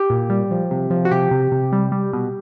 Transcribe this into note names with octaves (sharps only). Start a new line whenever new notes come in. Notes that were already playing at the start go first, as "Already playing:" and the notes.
Already playing: G4
A#2
G3
F3
C3
F3
F#4
C3 G4
C3
C3
G3
G3
B2